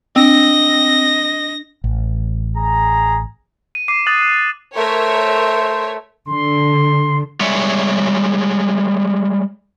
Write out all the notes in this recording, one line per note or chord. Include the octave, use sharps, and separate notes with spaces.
C4 D4 D#5 A#6
A1
G#4 A#5
D#7
D6 C7 D#7
D#6 F#6 A6 F#7
F#6
A3 A#4 C5 C#5 E5
D3 C6
G3 G#3 G#4 C#5 E5